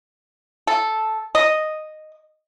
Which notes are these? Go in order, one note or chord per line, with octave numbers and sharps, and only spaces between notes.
A4
D#5